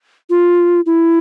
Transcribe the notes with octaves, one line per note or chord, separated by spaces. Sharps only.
F4
E4